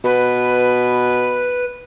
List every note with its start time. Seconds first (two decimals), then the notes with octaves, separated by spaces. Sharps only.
0.04 B2 B4